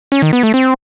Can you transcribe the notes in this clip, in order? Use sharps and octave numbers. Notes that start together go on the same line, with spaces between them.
C#4
D#3
B3
A3
C4